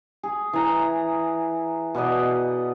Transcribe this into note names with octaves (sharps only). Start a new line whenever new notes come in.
G#4
E3 A#5
B2 B4 D5 D#5